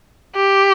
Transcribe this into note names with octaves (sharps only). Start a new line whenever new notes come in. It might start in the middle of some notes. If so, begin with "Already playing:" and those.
G4